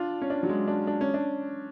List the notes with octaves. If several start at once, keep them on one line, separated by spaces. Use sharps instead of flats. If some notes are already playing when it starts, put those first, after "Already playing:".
Already playing: D4 F4
C#4
D4
F#3
G#3
D4
D4
C#4
D4